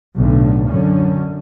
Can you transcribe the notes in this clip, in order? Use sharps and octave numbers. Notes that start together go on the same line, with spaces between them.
B1 A2 D3
F#2 D3 C#4